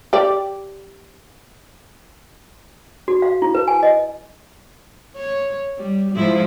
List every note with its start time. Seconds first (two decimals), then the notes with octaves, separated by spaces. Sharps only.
0.13 G4 D5
3.08 F#4
3.22 F5
3.42 E4
3.55 B4
3.68 G#5
3.83 D#5
5.17 C#5
5.78 G3
6.15 G#2 F3 E4